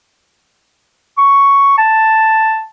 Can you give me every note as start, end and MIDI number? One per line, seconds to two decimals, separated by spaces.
1.18 1.78 85
1.78 2.64 81